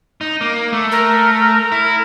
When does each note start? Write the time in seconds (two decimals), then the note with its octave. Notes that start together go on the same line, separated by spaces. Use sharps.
0.21 D#4
0.41 A#3
0.73 A3
0.91 A#4
1.72 E4